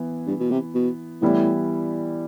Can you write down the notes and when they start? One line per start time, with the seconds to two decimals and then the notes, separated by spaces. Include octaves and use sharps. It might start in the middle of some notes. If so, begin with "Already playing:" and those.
Already playing: E3 B3 E4
0.27 G2
0.40 B2
0.51 C3
0.74 B2
1.21 A2 E3 G3 B3 E4